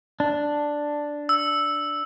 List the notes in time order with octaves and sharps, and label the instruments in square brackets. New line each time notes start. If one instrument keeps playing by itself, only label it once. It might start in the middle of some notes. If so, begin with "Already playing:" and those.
[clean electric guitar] D4
[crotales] E6